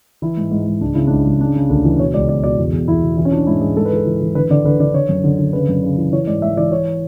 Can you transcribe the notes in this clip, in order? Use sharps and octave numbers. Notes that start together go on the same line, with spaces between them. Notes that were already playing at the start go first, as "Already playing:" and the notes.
E3 E4
G#2
G#2
G#2
C#2 D4
C#3 E4
C#2 D4
C#2
C#3 D4
C#3
D2 D4
E3
B2 C#5
C#2 D5
B2 D5
B2 D5
E2
E2
E2 E4
B2
E3 E4
C#4
E3 D4
G#2 E4
G#2 G#4
G#2 A4
B4
E3 A4
E3
E3
D3 B4
D3 D5
D3 B4
D3 D5
D3 C#5
F#2
D3
D3
C#3 B4
F#2
C#3
E3
E3 C#5
G#2 D5
G#2 E5
E3 D5
E3 C#5